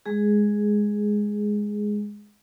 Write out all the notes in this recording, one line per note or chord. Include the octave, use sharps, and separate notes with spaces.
G#3 G#4